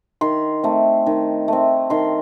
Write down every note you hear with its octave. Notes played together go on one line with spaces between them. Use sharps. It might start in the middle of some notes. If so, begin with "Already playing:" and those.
D#3 C6
A3 C4
D#3
A3 C4
D#3 C6